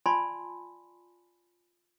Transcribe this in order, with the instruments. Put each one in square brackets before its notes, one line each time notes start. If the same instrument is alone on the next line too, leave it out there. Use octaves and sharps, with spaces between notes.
[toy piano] F4 D5 G#5 A5 B5 C6